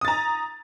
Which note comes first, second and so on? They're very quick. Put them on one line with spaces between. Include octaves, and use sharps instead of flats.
D#6 A6 A#5